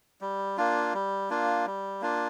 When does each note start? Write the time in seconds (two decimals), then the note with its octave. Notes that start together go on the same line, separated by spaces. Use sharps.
0.21 G3
0.57 A#3 D4 F4
0.94 G3
1.30 A#3 D4 F4
1.66 G3
2.01 A#3 D4 F4